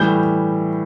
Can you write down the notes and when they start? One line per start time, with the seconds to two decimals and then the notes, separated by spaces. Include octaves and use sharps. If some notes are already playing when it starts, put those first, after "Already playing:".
Already playing: A2 E3 G3 G6